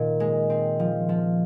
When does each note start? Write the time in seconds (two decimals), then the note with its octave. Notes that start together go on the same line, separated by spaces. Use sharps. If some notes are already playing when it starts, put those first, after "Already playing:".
Already playing: A#2 D#3
0.20 G#3
0.50 C4
0.80 F3
1.09 F3